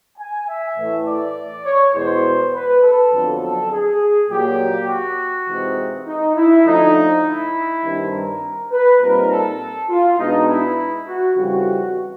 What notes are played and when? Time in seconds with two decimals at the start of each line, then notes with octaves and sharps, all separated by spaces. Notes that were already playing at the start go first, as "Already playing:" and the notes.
0.18 G#5
0.47 E5
0.77 A2 E3 A3
1.07 D5
1.65 C#5
1.95 E2 B2 G#3 C5
2.54 B4
2.83 A4
3.13 F2 D3 F#3 B3
3.42 A4
3.71 G#4
4.30 A#2 F#3 A#3 G4
4.89 F#4
5.48 C3 E3 G#3 C4 D#4
6.07 D#4
6.36 E4
6.65 D3 F3 A3 D#4
7.24 E4
7.83 G2 D#3 G3 C4
8.13 A#4
8.72 B4
9.01 A#2 G3 C4 D#4 A#4
9.31 A4
9.90 F4
10.19 B2 G#3 B3 D4 D#4
10.49 E4
11.08 F#4
11.37 F2 C#3 E3 G3 F#4